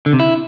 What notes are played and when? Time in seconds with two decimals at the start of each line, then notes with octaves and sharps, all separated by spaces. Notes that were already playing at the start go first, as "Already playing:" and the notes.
0.06 D3
0.13 C3
0.20 E4